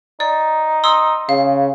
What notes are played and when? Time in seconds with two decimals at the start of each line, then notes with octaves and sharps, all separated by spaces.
0.20 D#4 D5
0.84 C6 D#6 E6
1.29 C#3 F5